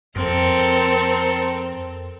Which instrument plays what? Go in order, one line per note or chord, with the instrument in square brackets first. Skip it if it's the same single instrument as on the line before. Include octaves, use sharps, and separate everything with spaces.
[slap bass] F2 [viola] C4 [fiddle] A4 A#4